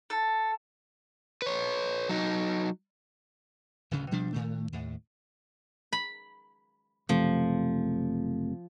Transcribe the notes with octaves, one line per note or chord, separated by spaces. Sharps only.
A4
B4 C#5
F#3 D#4
D1 D2 C#3
B2 F3 G3 D4
A2 D#3 A3
D#2 A2
B5
F#1 C3 F3 A3